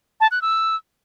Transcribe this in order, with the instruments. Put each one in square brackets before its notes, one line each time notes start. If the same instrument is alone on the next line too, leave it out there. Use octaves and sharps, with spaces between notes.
[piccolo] A5
F#6
E6